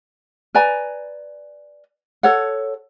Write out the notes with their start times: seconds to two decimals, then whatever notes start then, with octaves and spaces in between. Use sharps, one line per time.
0.55 B4 D5 G#5 A#5
2.23 A4 C#5 F#5